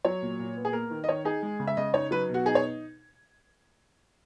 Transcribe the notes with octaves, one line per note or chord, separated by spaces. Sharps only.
F#3 C#5
A#2
A#2
B3
G#4
A#3 A#4
D#3
D#5
D#3 C#5
D#4 G#4
G#3
C#3
E5
C#3 D#5
D#4 C#5
F#3 B4
B2
F#4
D#4 G#4
C#5